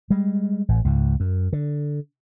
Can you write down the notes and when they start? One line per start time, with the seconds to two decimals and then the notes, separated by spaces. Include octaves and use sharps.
0.10 G3 G#3
0.69 A1
0.85 C#2 G#2
1.20 F#2
1.53 D3